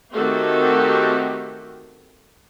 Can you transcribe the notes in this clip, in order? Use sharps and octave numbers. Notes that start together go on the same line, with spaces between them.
D#3 A3 C4 F#4 G4 A4